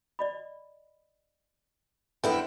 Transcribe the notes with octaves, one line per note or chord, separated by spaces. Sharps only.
D5 D#5 B5
F2 D3 B3 E4 G5